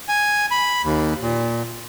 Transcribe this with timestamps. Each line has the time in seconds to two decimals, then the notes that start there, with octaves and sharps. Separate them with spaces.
0.09 G#5
0.51 B5
0.84 D#2
1.22 A#2